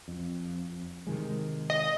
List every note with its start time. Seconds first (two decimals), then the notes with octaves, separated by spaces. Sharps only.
0.08 F2
1.07 C3 D#3 G#3
1.70 D#5